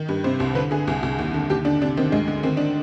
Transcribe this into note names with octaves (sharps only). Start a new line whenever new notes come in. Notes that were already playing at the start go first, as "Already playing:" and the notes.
Already playing: D#3
G2
C3 C5
C2
D3 B4
D3 G#4
C2
C2
D#2
D3
D#2 G4
D3 D4
C3 D4
D#3 C4
D2 G#3
D3
D#3 C4
D4